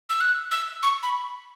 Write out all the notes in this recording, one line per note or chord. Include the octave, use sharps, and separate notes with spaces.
E6
F#6
E6
C#6
B5